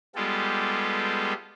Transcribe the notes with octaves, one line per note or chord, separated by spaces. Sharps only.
G3 G#3 B3 F4 G4 A4